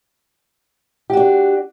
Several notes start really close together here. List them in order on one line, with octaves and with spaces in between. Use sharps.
G4 F#4 D4